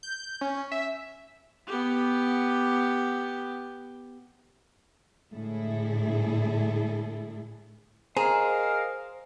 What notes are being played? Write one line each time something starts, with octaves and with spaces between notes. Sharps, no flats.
G6
C#4
E5
B3 G4
A2 D3 G#3 E4 G#4 A4
G#4 A#4 C5 D#5 F5 G#5 A#5